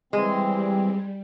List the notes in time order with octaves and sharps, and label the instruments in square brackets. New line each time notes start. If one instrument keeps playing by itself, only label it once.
[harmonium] E3 C4 [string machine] G3 [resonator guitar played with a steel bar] G#3